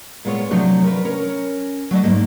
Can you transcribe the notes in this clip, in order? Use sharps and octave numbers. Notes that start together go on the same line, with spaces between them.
A#2 G#3 B3 F4 C#5
C3 F3 F#3 A3 D4
A#4 B4
C#4 A#4 C#5
F#3 A3 D4 D#5
G#2 A#3